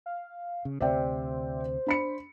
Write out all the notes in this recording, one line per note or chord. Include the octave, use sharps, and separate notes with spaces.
F5
C#3
D2 C3 C5 D5 E5 G5
D4 B5 C#7